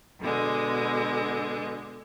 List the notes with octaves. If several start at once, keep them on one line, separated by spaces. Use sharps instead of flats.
B2 D3 G#3